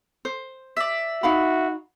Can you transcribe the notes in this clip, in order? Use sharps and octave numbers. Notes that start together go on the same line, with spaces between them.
C5
D5 E5
D#4 F#4 F5 B5